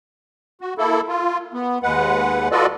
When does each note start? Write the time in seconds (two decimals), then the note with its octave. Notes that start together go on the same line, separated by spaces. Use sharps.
0.61 F#4
0.78 A#3 E4 A4
1.08 F4
1.54 B3
1.83 D#2 G#3 B4 F#5
2.51 F4 F#4 A4 B4 D5 D#5